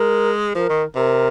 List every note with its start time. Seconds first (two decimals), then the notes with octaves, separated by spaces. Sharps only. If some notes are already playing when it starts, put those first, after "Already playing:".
Already playing: G#3 A#4
0.55 F3 A#4
0.70 D#3
0.96 C3 A#4